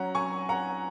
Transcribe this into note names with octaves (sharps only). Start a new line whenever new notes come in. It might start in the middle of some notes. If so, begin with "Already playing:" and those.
Already playing: F#3 C#4 F#5 A#5
G#5 C#6
F#5 A#5